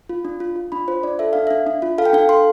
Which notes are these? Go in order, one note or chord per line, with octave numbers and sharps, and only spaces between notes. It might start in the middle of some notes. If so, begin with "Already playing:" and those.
F4
D4
F4
F4
D4 B5
F4 C5
D4 D5
A4 E5
D4 F5
D4 E5
D4
F4
A4 F5
G5
D4 F5
A4 C6